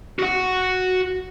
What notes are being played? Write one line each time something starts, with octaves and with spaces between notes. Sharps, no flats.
F#4 F#5